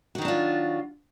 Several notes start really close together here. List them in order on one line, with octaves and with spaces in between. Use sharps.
F#4 D#3 F#3 D4 F4